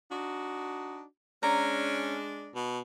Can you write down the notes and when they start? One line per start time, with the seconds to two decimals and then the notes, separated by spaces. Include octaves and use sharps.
0.11 D4 D#4 F#4
1.43 G#3 C#4 D4 A#5
2.55 B2